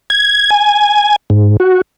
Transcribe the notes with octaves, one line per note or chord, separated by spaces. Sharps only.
G#6
G#5
G#2
F#4